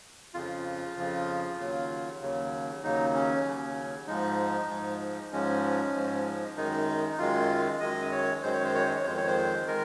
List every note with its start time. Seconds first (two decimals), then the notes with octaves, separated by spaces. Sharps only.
0.34 F2 C#3 F3 F4
0.97 F2 C#3 F3
1.59 D#2 C#3 F#3
2.21 D#2 C#3 F#3
2.83 D#2 C#3 F#3 D#4
3.14 C#4
3.45 D#2 C#3 F#3
4.07 G#2 F3 G#3 D#4
4.70 G#2 F3 G#3
5.32 G#2 F3 G#3 C#4
5.94 G#2 F3 G#3
6.56 F#2 D#3 G#3 D#4
7.12 D#4
7.18 F#2 D#3 G#3 F4
7.80 F#2 D#3 G#3 D#5
8.12 C#5
8.43 F#2 D#3 G#3 C5
8.53 C#5
8.64 C5
8.75 C#5
8.85 C5
8.96 C#5
9.05 F2 D#3 G#3 C5
9.17 C#5
9.27 C5
9.67 D#3 G#3 A#4